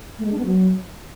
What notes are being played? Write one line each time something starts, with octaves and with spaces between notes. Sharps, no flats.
A3
G#3
D4
B3
F#3